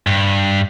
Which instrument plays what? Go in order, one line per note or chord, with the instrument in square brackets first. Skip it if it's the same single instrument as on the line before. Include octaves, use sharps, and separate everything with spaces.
[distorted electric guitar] G2